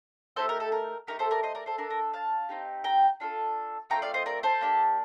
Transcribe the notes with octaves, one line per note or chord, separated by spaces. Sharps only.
A3 D#4 G4 A4 C5
A#4
A4
A#4
A3 D#4 G4 A#4
A4 C5
A#4 D5
C5 D#5
A#4 D5
A4 C5
D4 A4 A#4
A#4
F5 A5
C4 D#4 G4
G5 A#5
D4 F4 A4
A3 C4 F4 G5 A#5
D5 F5
C5 D#5
A#4 D5
A4 C5
A#3 D4 G4